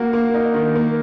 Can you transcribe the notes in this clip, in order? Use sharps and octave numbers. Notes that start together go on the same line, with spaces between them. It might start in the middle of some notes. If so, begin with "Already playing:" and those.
Already playing: A#3 F#4
A#3
D#4
D#3
A#3